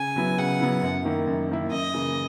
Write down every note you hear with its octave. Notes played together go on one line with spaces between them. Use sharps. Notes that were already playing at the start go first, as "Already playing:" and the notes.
Already playing: C#3 G#5
F#3 B3 E4
C#3 F#5
F#3 B3 E4
F#2
D#3 A#3 E4
F#2
D#3 A#3 E4
F#2 D#5
C#3 E3 A#3